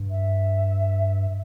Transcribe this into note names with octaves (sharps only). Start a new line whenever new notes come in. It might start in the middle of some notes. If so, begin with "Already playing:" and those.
Already playing: G2
E5